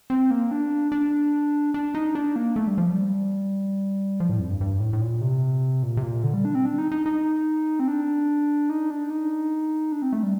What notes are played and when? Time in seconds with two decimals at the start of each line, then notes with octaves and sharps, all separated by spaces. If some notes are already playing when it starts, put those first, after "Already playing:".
0.10 C4
0.31 A#3
0.51 D4
0.92 D4
1.74 D4
1.95 D#4
2.15 D4
2.36 A#3
2.56 A3
2.67 G3
2.78 F3
2.90 G3
4.20 F3
4.29 A2
4.39 F2
4.50 G2
4.61 G2
4.80 A2
4.93 A2
5.01 A#2
5.21 C3
5.83 A#2
5.97 C3
6.03 A#2
6.23 D3
6.34 G3
6.45 D4
6.55 C4
6.66 D4
6.78 D#4
6.92 D#4
7.06 D#4
7.80 C4
7.88 D4
8.70 D#4
8.90 D4
9.10 D#4
9.92 D4
10.02 C4
10.13 A3
10.23 G3